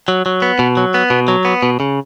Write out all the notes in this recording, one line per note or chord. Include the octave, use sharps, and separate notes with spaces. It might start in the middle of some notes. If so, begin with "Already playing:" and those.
F#3
F#3
B3
B2
F#3
B3
B2
F#3
B3
B2
C#3